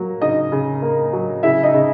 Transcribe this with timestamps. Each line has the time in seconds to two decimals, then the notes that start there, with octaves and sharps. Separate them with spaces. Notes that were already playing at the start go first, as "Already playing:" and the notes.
Already playing: F#3 A#3
0.21 C#3 D#4 D#5
0.52 C#3
0.82 A#3
1.13 F#3
1.43 C#3 E4 E5
1.63 D#4 D#5
1.74 C#3